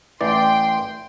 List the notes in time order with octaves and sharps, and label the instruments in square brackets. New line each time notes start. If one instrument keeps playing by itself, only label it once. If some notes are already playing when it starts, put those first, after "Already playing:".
[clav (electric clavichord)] A1 E3 D5 [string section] G5 C6